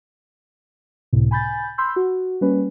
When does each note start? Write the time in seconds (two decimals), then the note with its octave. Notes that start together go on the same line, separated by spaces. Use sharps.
1.13 C#2 A2 C3
1.31 G#5 B5 G6 A6
1.78 B5 C6 E6 G6
1.96 F#4
2.41 G3 A#3 C#4 B4